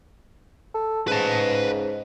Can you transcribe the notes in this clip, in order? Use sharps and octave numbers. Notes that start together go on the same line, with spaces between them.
A4
G#2 C#3 B4 A5